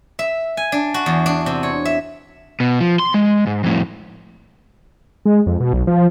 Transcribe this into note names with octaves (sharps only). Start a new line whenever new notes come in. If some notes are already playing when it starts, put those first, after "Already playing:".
E5
G#5
D4
F#4
E2
D4
C3
C#5
E5
B2
F3
C6
G#3
G#2
F2 A2
G#3
F2
B2
B1
F3